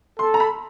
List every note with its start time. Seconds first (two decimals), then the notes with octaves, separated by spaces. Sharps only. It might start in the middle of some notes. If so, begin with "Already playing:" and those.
0.19 A4 C6
0.34 A#5
0.40 B5